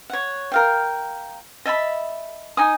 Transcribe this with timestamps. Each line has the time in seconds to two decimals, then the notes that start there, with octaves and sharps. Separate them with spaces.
0.10 C#5 F#5
0.52 A#4 F5 G5
1.65 D#5 E5 A5 B5
2.57 D#4 G#5 D#6